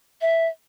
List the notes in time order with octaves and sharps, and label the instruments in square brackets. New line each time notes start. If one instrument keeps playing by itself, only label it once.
[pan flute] E5